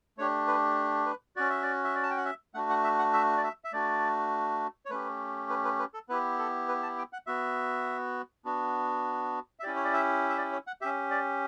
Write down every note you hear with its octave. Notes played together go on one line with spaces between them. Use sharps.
A3 D4 G4 C#5
B4
B4
C#4 F#4 D5
E5
D5
E5
D5
A5
G5
F#5
E5
A3 D4 F#4 F#5
F#5
E5
F#5
E5
D5
E5
E5
A3 D4 F#4 D5
C#5
A3 C#4 G4 B4
B4
B4
B4
A4
B3 E4 G4 B4
A4
B4
A5
G5
F#5
B3 F#4 E5
B3 D4 F#4
E5
C#4 E4 G4 D5
C#5
D5
E5
E5
D5
C#5
F#5
C#4 G4 E5
D5